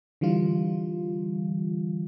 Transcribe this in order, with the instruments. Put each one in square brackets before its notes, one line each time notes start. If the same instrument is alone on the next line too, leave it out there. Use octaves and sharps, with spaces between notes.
[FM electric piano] D3 E3 G3 F4